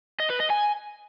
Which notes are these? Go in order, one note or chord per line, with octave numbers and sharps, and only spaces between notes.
D#5
B4
D#5
G#5